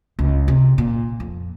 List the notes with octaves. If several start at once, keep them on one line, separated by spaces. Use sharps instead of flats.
C#2
C3
A#2
F2